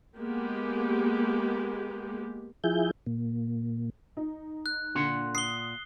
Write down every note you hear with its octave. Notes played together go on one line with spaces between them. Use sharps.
G#3 A#3 B3 G4
F3 E4 G#4 G6
A#2
D#4
F#6
A#2 D3 F#5 C6
D#6 C7 G7